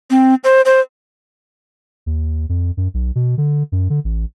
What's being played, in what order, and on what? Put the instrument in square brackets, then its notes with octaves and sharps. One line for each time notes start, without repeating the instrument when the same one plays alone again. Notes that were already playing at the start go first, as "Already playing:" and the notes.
[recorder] C4
C5
C5
[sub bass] D#2
F2
F#2
B1
B2
D3
F#2
D3
A1